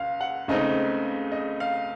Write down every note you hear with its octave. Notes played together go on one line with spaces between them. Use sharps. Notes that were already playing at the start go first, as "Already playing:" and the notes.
Already playing: C#2 F5
F#5
C#2 C#3 A3 C4 D#4 D#5
D#5
F5